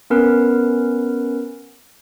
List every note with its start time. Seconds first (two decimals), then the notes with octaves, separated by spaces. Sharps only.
0.10 B3 C#4 A#4 B4